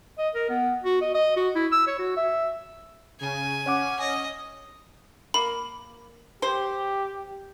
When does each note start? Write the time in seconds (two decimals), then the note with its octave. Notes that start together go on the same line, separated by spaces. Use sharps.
0.18 D#5
0.35 A#4
0.49 B3
0.84 F#4
1.02 D#5
1.15 D#5
1.36 F#4
1.55 E4
1.72 E6
1.87 C#5
1.99 F#4
2.17 E5
3.21 C#3 G#5
3.66 C#4 C#5 F#5 D6
3.99 D#5
5.34 A#3 B5
6.42 G4 C5